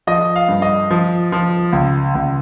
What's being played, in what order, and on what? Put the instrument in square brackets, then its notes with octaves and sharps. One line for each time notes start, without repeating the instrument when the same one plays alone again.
[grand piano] F3 D#5
F5
G2
D#5
F3
F3
C#2
C#2